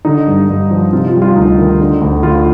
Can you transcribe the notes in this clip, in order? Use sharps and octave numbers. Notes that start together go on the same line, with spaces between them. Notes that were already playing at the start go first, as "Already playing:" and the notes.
D3 D#4
G2
G2
F3
C3 F4
F4
G3
F4
D2 D#4
D#3
D3
D2
D2 F4